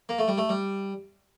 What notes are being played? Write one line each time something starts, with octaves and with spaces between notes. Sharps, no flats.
A#3
A3
G3
A3
G3